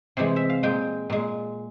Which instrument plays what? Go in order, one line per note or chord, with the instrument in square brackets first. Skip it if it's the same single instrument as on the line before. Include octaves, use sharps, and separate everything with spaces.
[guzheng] C3 E3 G#3 C5
E5
F5
A#2 G#3 G5
A#2 G#3